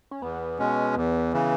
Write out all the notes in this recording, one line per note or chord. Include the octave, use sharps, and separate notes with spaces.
C#4
E2 B3
B2 G#3 C#4
E2
C#3 E3